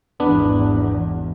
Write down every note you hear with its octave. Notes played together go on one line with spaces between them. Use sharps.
G#1 E2 B3 D4 B4